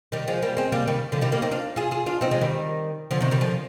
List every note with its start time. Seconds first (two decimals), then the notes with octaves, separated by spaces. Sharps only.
0.12 D#3 G3
0.28 F3 G#3
0.42 G3 A#3
0.57 G#3 C4
0.72 G3 A#3
0.87 D#3 G3
1.12 D3 F3
1.21 D#3 G3
1.32 G3 A#3
1.42 C4 D#4
1.52 D4 F4
1.76 F4 G#4
1.91 F4 G#4
2.06 D4 F4
2.21 C4 D#4
2.31 F3 G#3
2.41 D#3 G3
3.11 D3 F3
3.21 C3 D#3
3.31 D#3 G3
3.41 D3 F3